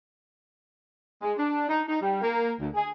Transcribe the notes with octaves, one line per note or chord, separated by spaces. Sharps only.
G#3
D4
D#4
D#4
G3
A#3
D2
G#4